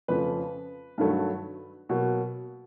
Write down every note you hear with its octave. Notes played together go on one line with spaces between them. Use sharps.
F2 C#3 F3 A3 B4
G2 D#3 F#3 A3
B2 F#3 A#3